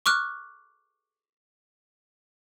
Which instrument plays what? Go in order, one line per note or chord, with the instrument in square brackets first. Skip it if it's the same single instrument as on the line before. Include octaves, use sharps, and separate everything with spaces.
[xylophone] C#6 D6 F6 F#6